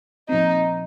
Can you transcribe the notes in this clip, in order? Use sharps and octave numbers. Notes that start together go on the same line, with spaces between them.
A#2 F3 C4 D#4